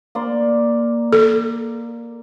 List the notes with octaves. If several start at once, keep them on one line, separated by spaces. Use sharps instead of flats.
A#3 D5 C6
A4